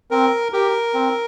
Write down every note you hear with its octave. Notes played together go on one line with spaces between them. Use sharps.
C4 A#4
G4 A#4
C4